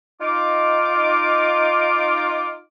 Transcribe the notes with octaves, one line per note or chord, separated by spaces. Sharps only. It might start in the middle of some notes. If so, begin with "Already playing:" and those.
D#4 F4 D6